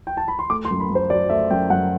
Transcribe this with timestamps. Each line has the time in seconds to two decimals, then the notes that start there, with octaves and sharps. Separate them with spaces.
0.07 G5
0.17 A5
0.28 B5
0.39 C6
0.50 A3 D6
0.65 C6
0.71 F#2
0.80 B5
0.90 F#2 C5
1.10 F#3 D5
1.30 A3 E5
1.50 F#2 G5
1.70 F#2 F#5